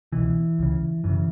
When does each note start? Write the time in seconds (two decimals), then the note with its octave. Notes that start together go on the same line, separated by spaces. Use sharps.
0.12 C#2 B2 E3
0.59 C#2 C#3
1.04 F#2 C#3 E3